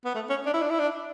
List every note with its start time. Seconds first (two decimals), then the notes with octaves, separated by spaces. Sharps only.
0.05 B3
0.15 A3
0.30 C#4
0.46 D4
0.54 E4
0.62 D4
0.70 E4
0.79 D4